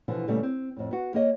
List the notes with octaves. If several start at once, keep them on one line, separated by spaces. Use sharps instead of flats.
B2 D3 E3 F3
A#2 C#3 E3 G3 A3 B3
C4
F2 A2
B3 F#4
A#3 G#4 C#5 D#5